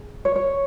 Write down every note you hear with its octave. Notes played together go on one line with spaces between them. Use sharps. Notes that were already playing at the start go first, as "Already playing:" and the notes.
Already playing: G#4
C#5
C#5